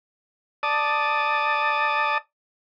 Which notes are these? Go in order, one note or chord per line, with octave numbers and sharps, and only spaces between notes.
D5 A5 D#6